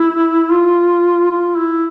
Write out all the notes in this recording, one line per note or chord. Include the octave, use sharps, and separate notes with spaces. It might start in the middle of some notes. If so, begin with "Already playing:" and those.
Already playing: E4
F4
F4
E4